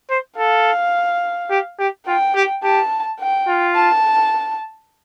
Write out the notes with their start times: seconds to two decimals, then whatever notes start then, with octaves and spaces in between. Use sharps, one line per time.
0.10 C5
0.38 A4 F5
1.50 G4
1.79 G4
2.07 F4 G5
2.35 G4
2.64 G4 A5
3.20 G5
3.48 F4
3.76 A5